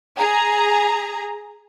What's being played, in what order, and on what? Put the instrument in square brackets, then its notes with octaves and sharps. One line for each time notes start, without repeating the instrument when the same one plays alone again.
[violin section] G#4 A#5